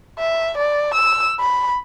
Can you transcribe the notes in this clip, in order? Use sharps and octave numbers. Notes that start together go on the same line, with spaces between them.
E5
D5
E6
B5